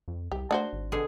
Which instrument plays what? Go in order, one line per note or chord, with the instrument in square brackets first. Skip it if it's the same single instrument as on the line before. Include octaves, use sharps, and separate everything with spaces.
[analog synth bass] F2
[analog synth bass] C2 [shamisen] G4
[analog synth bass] A3 [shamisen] D4 F#4 C5
[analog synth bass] G#1
[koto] B2 D3 G#4